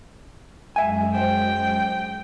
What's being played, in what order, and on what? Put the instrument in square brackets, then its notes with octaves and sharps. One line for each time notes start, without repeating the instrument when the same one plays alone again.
[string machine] F#2 G#3 [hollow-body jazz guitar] E5 G#5
[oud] C#4 F#4 C5 [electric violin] G5